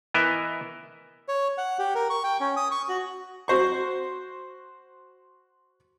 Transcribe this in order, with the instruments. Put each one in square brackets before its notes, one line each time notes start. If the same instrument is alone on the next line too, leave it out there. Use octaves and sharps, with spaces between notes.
[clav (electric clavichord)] E3 B3 A#4 D#5 E5
[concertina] C#5
F#5
G4
A#4
C#6
G5
C#4
D#6
C#6
F#4
[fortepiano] F#4 C5 C#6